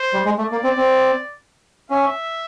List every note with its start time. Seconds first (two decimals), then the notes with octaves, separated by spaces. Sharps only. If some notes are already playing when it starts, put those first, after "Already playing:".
Already playing: C5
0.13 G3
0.25 G#3
0.38 A3 D5
0.52 A#3
0.64 C4
0.77 C4
1.90 C#4 E5